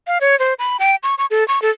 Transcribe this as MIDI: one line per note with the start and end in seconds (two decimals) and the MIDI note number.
0.07 0.18 77
0.21 0.38 73
0.39 0.54 72
0.59 0.77 83
0.80 0.96 79
1.03 1.15 85
1.18 1.26 85
1.31 1.46 69
1.48 1.62 85
1.62 1.70 69